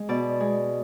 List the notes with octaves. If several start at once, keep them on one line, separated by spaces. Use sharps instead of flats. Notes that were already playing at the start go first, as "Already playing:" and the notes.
Already playing: G#3
B2 D5
G#3